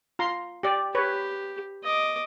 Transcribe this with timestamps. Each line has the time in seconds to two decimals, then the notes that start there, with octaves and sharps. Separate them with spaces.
0.19 F4 A#5 C6
0.63 G4 D5
0.95 G4 B4 C#5
1.84 D#5 D6